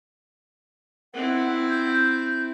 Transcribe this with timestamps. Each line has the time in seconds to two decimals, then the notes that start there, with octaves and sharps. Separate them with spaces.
1.14 C4 E4 F#5
1.69 G6